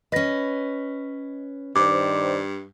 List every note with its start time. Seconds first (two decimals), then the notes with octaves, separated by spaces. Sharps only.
0.12 C#4 B4 D#5 A#6
1.76 G2 D#3 C5 D5 D6